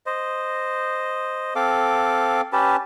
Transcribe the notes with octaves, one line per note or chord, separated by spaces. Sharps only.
C5 D#5
C4 A4 F5 D6
C#4 G4 B4 A5